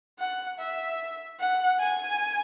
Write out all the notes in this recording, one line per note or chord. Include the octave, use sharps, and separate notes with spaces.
F#5
E5
F#5
G#5